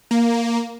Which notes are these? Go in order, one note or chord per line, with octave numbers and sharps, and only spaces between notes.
A#3